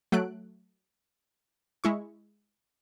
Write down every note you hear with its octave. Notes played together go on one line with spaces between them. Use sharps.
F#3 A3 F#6 D7
G#3 E4 C#6